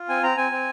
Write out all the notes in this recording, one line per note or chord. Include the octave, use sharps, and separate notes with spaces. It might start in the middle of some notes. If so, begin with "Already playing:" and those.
Already playing: F4
C4 G#5
C4 A#5
C4 G#5
C4